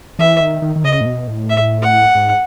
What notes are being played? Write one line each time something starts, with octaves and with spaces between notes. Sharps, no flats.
E3 E5
D#3
D#3
D#3
C#3 D#5
A2
B2
A2
E5
F#5
G#2